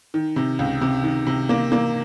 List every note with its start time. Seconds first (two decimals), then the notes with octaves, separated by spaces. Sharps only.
0.14 D#3
0.36 C3
0.59 C#2
0.81 C3
1.04 D#3
1.27 C3
1.49 A#3
1.72 A#3